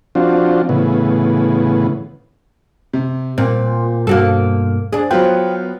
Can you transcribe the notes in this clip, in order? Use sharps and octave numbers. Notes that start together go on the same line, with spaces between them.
F3 C4 D4 F4 F#4
A2 C#3 E3 B3
C3
A#2 C4
G2 B2 A#3 F#4 A4
D4 G#4
F#3 B3 F4 G5